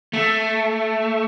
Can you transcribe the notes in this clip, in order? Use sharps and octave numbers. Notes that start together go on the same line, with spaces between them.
A3